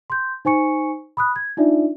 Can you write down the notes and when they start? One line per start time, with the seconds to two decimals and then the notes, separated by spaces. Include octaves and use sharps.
0.10 C6 G6
0.45 D#4 C5 G#5 C#6 C#7
1.17 B5 D#6 F#6
1.36 G#6
1.57 D4 D#4 F4 D5 E5